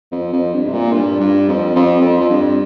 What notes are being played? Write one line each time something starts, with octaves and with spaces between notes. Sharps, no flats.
F2
F2
G2
C3
A#2
G2
G2
F2
F2
F2
F2
G2